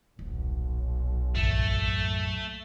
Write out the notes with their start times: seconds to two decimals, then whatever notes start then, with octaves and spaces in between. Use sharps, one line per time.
0.19 D#1 B1
1.35 A1 F#2 A3